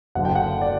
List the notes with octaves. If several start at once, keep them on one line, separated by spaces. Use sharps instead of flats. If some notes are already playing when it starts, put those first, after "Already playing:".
F#1 F#2 D3 F#5
G5
F#5
D5